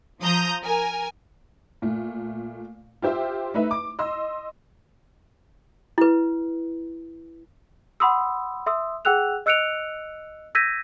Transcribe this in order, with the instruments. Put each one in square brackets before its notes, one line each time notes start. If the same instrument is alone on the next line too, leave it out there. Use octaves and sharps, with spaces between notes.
[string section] F3 A#5 D#6 G6
A#4 G#5
[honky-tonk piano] A#2 A3
F4 G4 C5 E5
A3 D#4 B4 E5
D6
D#5 C6 E6
[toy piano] E4 B4
[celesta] F#5 B5 C6 D#6 E6
E5 C6 D#6 E6
G#4 F#5 G5 E6 F#6 F7
D#5 E6 F#6 C#7 D7 F7
E6 G6 G#6 A#6 B6 D#7